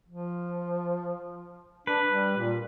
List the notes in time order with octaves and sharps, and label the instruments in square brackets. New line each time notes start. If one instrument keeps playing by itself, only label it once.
[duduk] F3
[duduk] D4 [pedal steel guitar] B4
[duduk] G3
A#2